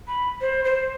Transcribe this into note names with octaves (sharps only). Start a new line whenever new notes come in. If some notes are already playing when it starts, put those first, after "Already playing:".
B5
C5
C5